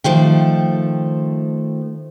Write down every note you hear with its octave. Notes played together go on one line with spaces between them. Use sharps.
D#3 F3 A3 G5